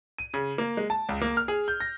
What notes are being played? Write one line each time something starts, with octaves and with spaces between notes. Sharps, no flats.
D#7
C#3
A#3
G#3
A5
C#2
A#3
F6
G#4
G6
A#6